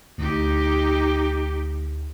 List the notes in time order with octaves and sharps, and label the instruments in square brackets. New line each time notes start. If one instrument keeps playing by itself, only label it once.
[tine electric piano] D2 [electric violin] D#4 G4